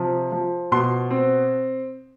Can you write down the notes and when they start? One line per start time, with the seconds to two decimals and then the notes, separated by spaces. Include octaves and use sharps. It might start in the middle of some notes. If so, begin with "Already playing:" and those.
Already playing: C3 F3
0.32 F3
0.72 B2 C6
1.11 C4